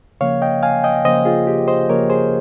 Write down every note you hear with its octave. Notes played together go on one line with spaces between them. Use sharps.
C#3 F3 A#3 C#5 F5
D#5 G5
F5 G#5
D#5 G5
C#3 F3 A#3 C5 D#5
F4 G#4
G4
C5 D#5
C#3 F3 A#3 A#4 C#5
G#4 C5